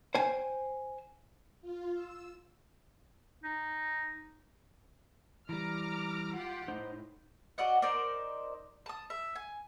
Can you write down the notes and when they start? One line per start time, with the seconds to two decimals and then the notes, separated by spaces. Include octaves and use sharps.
0.15 C5 G5 G#5
1.62 F4
1.95 E6
3.43 D#4
5.49 E3 G3 A#5 D6 F6
6.36 F4 G4 F#5
6.68 A2 D#4 C5
7.58 F#4 D5 D#5 F#5
7.82 D#4 A#4 C5 D5
8.86 A5 D#6
9.10 E5
9.35 G#5